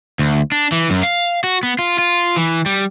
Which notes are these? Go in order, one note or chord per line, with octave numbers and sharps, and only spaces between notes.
D2
D4
E3
F#2
F5
F#4
B3
F4
F4
E3
G3